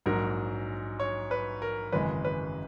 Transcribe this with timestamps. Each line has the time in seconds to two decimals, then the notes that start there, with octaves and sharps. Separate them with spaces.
0.06 A#1 G#2 F#3 A#4
1.00 C#5
1.31 B4
1.62 A#4
1.92 G#1 F#2 C#3 E3 G#3 B4
2.25 B4